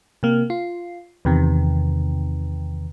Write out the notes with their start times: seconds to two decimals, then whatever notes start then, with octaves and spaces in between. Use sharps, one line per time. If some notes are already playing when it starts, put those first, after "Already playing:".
0.23 C3 A#3
0.50 F4
1.25 E2 C3 D#3